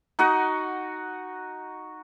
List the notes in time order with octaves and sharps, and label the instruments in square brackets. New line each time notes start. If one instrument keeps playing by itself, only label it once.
[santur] D#4 F#4 D#5 F#5